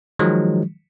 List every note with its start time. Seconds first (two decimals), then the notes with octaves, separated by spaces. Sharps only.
0.19 D#3 F3 F#3 G#3